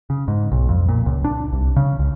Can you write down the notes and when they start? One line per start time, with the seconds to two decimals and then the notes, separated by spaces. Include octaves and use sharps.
0.10 C#3
0.28 G#2
0.52 B1
0.69 F2
0.89 A#2
1.06 C#2
1.24 D4
1.53 C2
1.76 C#3
1.99 C#2